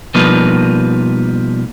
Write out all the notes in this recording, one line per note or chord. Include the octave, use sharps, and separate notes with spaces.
B2 F3 G3 A#3 D#4 B4